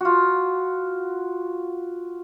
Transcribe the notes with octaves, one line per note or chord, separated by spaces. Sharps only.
F4 F#4